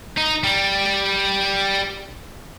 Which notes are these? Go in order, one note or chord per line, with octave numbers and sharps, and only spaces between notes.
D#4
G3